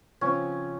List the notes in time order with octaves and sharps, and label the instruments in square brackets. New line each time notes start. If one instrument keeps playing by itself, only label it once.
[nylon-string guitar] C#3 F3 C4 F4 [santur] C#4